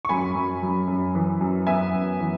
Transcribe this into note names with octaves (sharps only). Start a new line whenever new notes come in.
C#6
F#2 G#5 B5
F#2
F#2
F#2
E3
F#2
B3 E5 G#5
F#2
E3